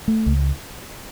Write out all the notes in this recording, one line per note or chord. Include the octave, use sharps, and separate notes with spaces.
A3
C#2